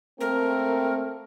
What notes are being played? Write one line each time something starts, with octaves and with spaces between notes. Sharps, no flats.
A3 A#3 C4 A#4